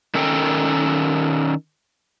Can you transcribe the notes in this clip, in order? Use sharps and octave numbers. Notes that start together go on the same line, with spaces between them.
D#3 C#4 A4 A#4 F#5 G5